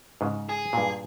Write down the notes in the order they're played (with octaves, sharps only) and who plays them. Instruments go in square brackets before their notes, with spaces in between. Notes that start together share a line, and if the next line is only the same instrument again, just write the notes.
[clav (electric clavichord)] G#2 C#3
[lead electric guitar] G#4
[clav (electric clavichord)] G2 A#2